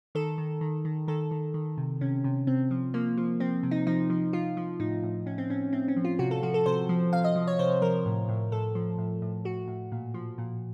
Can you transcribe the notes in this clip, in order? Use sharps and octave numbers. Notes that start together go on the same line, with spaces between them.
D#3 A4
D#3
D#3
D#3
D#3 A4
D#3
D#3
C3
C3 C#4
C3
C3 C4
F3
F3 A#3
F3
F3 C4
C3
D#4
F3 D#4
F3
F3 F4
F3
A2 D#4
A2
A2 C#4
C4
A2 C#4
A2 C4
C#4
F3
F4
C3 F#4
A4
F3 F#4
A4
C3 C5
F3
C3 F5
D#5
F3
C#5
C3 C5
F3 A#4
A2
A2
A2 A4
F3
A2
A2
A2 F#4
A2
A#2
F3
A#2